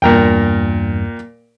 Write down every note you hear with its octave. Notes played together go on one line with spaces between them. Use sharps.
E2 G2 A#2 A#4 G5